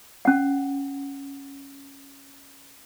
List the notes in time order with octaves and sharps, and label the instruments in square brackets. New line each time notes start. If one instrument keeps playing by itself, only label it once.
[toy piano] C#4 F#5